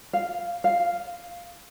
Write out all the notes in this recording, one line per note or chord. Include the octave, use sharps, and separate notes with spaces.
F5
F5